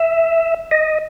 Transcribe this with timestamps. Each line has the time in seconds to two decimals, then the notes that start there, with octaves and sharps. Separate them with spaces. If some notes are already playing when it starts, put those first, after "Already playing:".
Already playing: E5
0.71 D#5